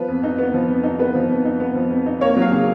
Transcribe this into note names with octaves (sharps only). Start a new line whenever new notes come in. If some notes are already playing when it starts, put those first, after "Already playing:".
Already playing: F3 B3 B4
F2
D#4
B3
F3
F2
D#4
B3 B4
F3
F2
D#4
B3
F3
F2
D#4
A#3 C#5
F#3
F5
C#3